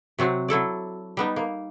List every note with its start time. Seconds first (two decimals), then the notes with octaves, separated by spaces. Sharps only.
0.19 C3 F#3 C4 F#4
0.48 F#3 E4 A4 D5
1.17 G3 B3 D#4
1.36 A#3